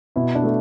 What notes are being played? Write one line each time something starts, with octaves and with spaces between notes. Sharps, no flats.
B2 E4
D4
A3